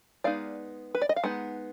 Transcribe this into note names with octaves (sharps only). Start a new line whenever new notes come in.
G#3 B3 D#4 D5 F5
B4
D5
D#5
F5
G#3 B3 D#4 F#5